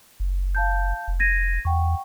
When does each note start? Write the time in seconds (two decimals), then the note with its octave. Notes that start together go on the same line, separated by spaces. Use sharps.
0.20 F#1
0.55 F5 A5 G6
1.08 F1
1.20 G#6 A#6 D#7
1.65 E2 F#5 G5 C#6